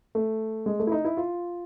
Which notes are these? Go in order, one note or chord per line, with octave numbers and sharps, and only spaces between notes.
A3
G#3
A3
E4
D#4
E4
F4